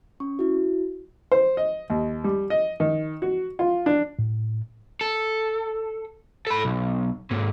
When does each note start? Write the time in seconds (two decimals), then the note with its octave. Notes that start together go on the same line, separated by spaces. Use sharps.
0.20 C#4 C#6
0.39 E4 F#4
1.32 C5
1.57 D#5
1.90 D#2
2.24 G3
2.50 D#5
2.80 D#3
3.22 F#4
3.59 F4
3.86 D4
4.19 A2
5.01 A4
6.47 A4 B5
6.65 B1
7.31 G#2 A#3